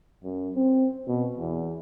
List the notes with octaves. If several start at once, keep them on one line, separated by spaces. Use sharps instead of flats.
F#2
C4
B2
E2